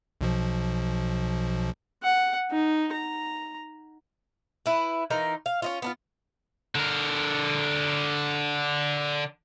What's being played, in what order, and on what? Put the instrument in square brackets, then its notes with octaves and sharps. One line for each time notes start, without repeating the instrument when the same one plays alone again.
[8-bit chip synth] B1 B2 F3
[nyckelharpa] F#5
D#4
A#5
[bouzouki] E4 B4
E3 D#4 F4 A#4
F5
C#4 D#4 F4
B3 D4 F4
[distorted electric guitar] D3 A#4